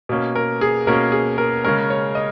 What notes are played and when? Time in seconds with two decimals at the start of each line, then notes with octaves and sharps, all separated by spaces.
0.09 B2 A#3 C#4
0.36 A#4
0.61 G#4
0.87 B2 A#3 C#4 A#4
1.12 G#4
1.38 A#4
1.64 C#3 G#3 C#4 A#4
1.90 C#5
2.15 D#5